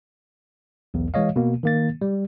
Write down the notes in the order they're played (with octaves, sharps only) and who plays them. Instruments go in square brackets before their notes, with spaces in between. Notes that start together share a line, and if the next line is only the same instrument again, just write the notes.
[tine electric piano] B1 E2
E3 G#3 C#5 D#5 F5
B2 A#3
D#3 A#3 A6
G3